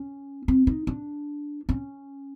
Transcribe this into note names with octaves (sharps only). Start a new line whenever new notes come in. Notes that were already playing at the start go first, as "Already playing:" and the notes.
Already playing: C#4
C4
D#4
D4
C#4